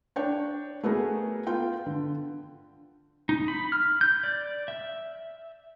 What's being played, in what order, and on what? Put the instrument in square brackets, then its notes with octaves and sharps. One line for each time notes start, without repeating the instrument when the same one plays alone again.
[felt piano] D4 C#5 G5
A3 B3 F#4 G#4 A#4
B3 F4 G5
D3
[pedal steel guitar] D#4
B5
F6
G6
D5
E5